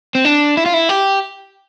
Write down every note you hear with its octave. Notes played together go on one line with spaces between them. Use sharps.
C4
D4
E4
F4
E4
G4